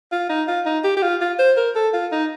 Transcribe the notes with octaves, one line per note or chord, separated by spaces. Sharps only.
F4
D#4
F4
D#4
G4
G4
F4
F4
C5
A#4
A4
F4
D#4